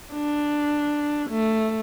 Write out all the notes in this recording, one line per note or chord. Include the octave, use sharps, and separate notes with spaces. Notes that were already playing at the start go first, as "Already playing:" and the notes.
D4
A3